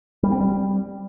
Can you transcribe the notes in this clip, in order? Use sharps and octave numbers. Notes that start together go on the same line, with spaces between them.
G3
C4
G3